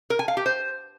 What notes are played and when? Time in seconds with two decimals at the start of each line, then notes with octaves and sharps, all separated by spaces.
0.10 A#4
0.19 G#5
0.28 F5
0.37 G4
0.46 C5